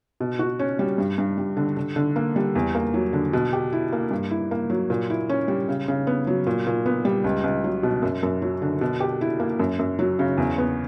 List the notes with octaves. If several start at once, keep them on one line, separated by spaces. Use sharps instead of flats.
B2
F#4
C#4
G3
G2
G2
G3
D3
D3
D3
A#3
G3
E2
A#3
F#3
D3
B2
G4
E4
A#3
G2
E4
A#3
F#3
A#2
E4
C#4
G3
C#3
C#3
B3
F#3
A#2
A#2
B3
G3
C#2
C#2
F#3
B2
F#2
F#2
F#3
D3
B2
G4
E4
A#3
F#2
F#2
F#3
C#3
E2
B3